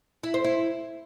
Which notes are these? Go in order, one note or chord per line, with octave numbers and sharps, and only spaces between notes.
E4
C5
E4